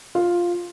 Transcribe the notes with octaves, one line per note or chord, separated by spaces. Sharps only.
F4